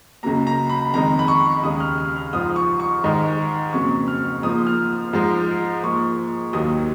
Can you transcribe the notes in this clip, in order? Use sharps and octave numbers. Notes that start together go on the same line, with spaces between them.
C#2 C#3 F#3 A#3 A#5
A#5
B5
F2 D#3 G#3 A#5
B5
C#6
D#2 C#3 G#3 D#6
F6
F6
F6
G#2 F3 G#3 D#6
C#6
C#6
G#2 D#3 G#3
F2 C#3 F#3 A#3 C#6
F6
G#2 F3 A#3 D#6
F6
G#2 F3 G#3
G#2 F3 A#3 C#6
D#2 D#3 F#3 A#3 D#6